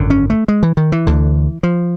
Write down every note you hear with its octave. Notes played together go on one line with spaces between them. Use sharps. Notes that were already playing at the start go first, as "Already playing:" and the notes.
Already playing: G#1 F#2 D3
C#4
A3
G#3
E3
D#3
E3
D2 D3
F3